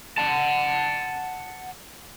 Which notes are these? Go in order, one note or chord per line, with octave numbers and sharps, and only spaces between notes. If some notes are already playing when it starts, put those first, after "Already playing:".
F#5 A5